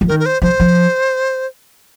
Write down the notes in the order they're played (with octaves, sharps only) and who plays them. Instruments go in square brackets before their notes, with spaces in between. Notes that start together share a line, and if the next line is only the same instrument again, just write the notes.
[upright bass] F3
[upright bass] D#3 [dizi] A#4
[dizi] A#4
C5
[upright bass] F3 [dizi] C5
[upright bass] F3